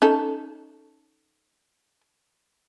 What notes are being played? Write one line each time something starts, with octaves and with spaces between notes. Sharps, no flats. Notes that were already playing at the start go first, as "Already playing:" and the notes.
C#4 D#4 A4